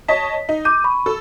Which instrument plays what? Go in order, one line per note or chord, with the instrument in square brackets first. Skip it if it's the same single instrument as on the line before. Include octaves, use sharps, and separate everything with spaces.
[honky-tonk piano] C#5 D#5 A5 [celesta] B6
[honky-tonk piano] D#4
[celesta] D6 G6 [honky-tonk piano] D#7
[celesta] B5 C#6
[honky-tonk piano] A4